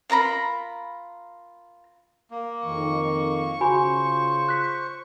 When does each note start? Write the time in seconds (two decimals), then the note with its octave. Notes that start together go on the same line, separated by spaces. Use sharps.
0.10 F4 A#4 A#5 B5
2.31 A#3
2.65 F2 D#3 C#6
3.60 C#3 F4 F#4 C5 G#5 B5
4.49 F#6 B6